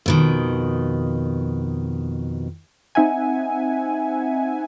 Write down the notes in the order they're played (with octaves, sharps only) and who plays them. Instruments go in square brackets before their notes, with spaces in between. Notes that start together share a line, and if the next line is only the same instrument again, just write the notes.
[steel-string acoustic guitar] F2 B2 D#3
[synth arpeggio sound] C4 D#4 E5 F#5 G#5